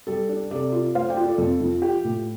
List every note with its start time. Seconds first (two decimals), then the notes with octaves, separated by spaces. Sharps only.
0.07 G3 A4
0.29 D4
0.51 C3 A4 D5
0.72 F4
0.95 A3 C5 F5
1.09 D5 G5
1.17 F4
1.24 A4 D5
1.38 F2 A4
1.60 F3
1.82 F4 G4
2.04 A2